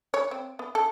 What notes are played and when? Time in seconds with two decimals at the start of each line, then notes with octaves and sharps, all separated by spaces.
0.14 C#5
0.31 C4
0.59 B3
0.75 A4